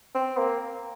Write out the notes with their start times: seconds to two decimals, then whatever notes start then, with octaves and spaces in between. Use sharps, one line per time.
0.15 C4
0.37 A#3